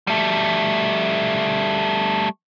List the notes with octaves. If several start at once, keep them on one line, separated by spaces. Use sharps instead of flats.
G3 A3